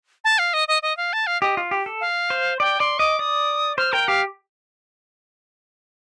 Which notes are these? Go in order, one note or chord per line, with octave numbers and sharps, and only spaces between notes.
A5
F5
D#5
D#5
D#5
F5
A5
F5
G4 D#5
F4
G4
A4
F5
C5
D5 G5
D5 C6
D#5 D6
D5 D#6
C5 F6
A#4 G5
G4 F5